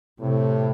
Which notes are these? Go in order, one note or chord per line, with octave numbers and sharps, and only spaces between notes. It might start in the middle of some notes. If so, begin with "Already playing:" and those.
A2 C3